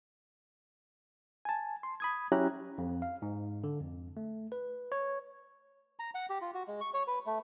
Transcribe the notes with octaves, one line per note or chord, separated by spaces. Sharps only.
G#5 A5
C6
B5 D#6 G#6
F#3 C#4 E4 G4 A#5 F#6
F2
F5
G#2
D3
F2
A3
B4
C#5
A#5
F#5
G4
F4
F#4
G#3
C#6
C#5
B4
A3